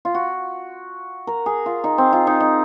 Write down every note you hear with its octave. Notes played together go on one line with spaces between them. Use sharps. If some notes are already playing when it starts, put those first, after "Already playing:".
F4
F#4
A#4
G#4
F4
D#4
C4
F4
D#4
D#4